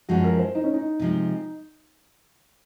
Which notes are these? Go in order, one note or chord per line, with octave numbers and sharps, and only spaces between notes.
F#2 F3 G#3 C#4 F#4
A#4
C5
D#4
C#4
D#4
C3 F3 G#3